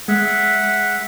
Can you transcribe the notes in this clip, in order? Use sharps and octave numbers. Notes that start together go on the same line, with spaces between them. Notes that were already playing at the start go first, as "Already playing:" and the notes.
G#3 E5 F#5